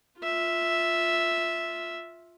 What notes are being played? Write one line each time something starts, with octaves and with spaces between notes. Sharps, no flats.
F4 E5